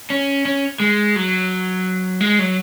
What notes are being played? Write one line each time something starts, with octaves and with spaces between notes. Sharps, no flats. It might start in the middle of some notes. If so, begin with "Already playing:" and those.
C#4
C#4
G#3
F#3
G#3
F#3